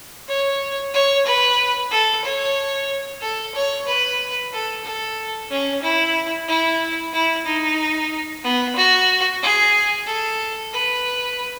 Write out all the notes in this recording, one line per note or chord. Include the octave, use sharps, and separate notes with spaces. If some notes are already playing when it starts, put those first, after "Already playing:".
C#5
C#5
B4
A4
C#5
A4
C#5
B4
A4
A4
C#4
E4
E4
E4
D#4
B3
F#4
G#4
A4
B4